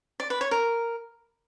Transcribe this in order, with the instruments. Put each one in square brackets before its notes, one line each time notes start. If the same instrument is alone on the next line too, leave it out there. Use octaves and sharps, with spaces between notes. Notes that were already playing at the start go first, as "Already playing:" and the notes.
[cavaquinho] D5
B4
C#5
A#4